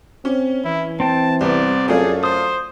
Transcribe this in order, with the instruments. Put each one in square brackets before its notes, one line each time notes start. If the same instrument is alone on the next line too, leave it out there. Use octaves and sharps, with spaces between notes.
[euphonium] C4 [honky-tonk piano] C#4
[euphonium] E3 [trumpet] E4
[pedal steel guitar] C4 G5 [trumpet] A5
[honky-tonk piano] C2 B3 [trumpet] D5
[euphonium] F#2 [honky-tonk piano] A3 F4 D5 [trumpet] G#4
[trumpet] C5 [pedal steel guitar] D#6